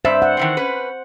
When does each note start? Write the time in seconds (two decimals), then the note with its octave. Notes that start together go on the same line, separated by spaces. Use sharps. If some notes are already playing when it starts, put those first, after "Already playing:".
0.05 G2 C5 D5 E5
0.22 F#5
0.37 D#3 E3 C4
0.57 C#4 B4